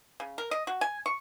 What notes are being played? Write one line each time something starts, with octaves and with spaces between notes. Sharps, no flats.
C#3
A#4
D#5
F#4
G#5
C#6